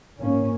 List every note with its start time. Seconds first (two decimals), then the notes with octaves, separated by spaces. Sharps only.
0.18 G#2 F3 A#3 C#4